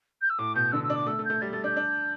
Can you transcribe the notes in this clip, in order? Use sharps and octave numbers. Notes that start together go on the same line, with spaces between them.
G6
E6
A2 D6
B2 G6
D3 E6
E6
D4
D6
A3 E6
A3
G6
A3
G3 A6
A3 A6
D4 G6
D4